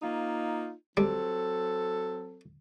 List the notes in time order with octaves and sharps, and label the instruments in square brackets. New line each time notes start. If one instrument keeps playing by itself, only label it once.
[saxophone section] A#3 D#4 F4
[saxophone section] F#3 C4 A4 [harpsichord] G3